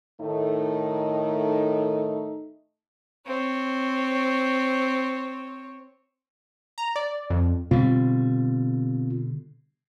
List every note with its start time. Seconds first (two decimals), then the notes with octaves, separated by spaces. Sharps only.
0.20 A2 D#3 A3 D#4
3.27 C4 C#5
6.78 A#5
6.96 D5
7.30 F2
7.71 B2 D3 G3 C4 F4